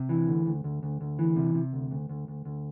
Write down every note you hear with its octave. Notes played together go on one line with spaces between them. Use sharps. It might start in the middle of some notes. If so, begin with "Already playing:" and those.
Already playing: C3
E3
D2
D2
D2
D2
D2
E3
C3
C3
D2
D2
D2
D2
D2